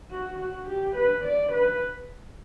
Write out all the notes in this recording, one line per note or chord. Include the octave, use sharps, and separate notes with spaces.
F#4
F#4
G4
B4
D5
B4